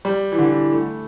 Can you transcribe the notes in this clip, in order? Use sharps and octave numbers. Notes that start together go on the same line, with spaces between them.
G3
E3
D3
E3
A3